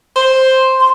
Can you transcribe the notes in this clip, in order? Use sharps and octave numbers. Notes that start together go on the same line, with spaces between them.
C5
C6